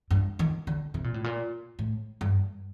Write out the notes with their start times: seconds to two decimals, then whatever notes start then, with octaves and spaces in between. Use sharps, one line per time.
0.11 G2
0.39 D#3
0.67 D3
0.94 C3
1.04 A#2
1.14 A2
1.24 A#2
1.79 A2
2.21 G2